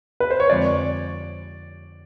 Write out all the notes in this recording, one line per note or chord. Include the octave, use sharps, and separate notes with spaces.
B4
C5
C#5
F2 D3 F3 G#3 C4 D5